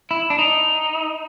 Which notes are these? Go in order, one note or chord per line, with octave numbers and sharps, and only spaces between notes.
E4
D4
D#4